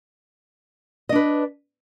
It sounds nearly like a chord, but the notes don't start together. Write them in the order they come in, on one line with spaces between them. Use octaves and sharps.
D#5 D4 B4